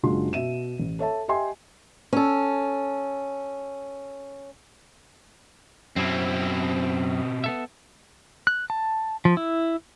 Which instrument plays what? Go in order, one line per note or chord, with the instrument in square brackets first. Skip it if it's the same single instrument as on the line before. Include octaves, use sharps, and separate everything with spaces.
[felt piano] F#1 G#3 D4 F4 F#4 C6
B2 E5 D#7 E7
A1
A4 C#5 E5 A5
G4 D#5 E5 G5 G#5 C6
[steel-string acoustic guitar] C#4 A4
[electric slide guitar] F#2 E4 [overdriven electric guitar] B2 C4
[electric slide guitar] B3 A4 E5
[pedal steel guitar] F#6
A5
F3
E4